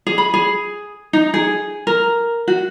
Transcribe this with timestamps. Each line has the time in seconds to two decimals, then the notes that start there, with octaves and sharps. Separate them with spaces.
0.07 G#4
0.18 B5
0.34 G#4
1.13 D#4
1.34 G#4
1.87 A#4
2.48 F#4